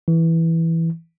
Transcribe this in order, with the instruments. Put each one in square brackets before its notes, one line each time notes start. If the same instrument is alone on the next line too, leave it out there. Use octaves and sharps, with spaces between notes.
[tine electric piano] E3